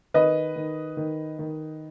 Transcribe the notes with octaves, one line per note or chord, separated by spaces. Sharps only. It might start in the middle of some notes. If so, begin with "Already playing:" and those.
D#3 B4 D#5
D#3
D#3
D#3